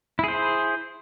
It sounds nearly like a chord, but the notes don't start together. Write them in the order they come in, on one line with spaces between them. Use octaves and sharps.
E4 G#4 C5